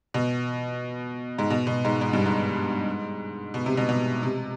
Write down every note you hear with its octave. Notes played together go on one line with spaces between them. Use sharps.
B2
G#2
B2
B2
G#2
G#2
G2
G#2
B2
C3
B2
B2
C3